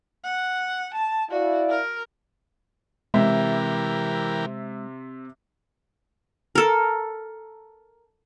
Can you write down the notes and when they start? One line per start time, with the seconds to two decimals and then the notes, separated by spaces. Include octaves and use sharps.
0.24 F#5
0.94 A5
1.31 E4 F#4 D5 F5
1.69 A#4
3.14 C3 E3 G#3 G4 A#4 E5
6.55 A4 A#4